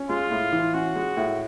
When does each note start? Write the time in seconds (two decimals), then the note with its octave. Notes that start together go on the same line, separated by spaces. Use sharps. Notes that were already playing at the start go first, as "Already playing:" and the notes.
Already playing: C#4
0.09 G#3 F4
0.31 A2
0.52 E3
0.74 C#4 F#4
0.96 G#3
1.17 A2